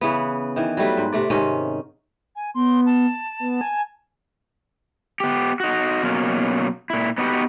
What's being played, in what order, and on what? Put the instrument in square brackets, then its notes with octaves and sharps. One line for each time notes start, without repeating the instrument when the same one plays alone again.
[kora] C#3 E3 B3
D#3 E3
F#3 G3 A3 B4
G#2
C3 A3 D5
G#2 C3 D#3 C#4
[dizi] G#5
[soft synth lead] B3 [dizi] C6
[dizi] A5
[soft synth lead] B3
G#5
[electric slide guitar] B3 G4
D#4 F#4
B2 F#3 A#3 C#4
A#2 E4
B3 D#4 F#4 G4 B4